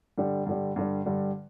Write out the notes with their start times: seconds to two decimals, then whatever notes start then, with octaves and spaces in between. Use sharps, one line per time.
0.18 G2 D3 G3
0.47 G2 D3 G3
0.76 G2 D3 G3
1.06 G2 D3 G3